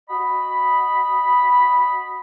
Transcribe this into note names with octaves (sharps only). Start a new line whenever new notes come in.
F#4 D#5 B5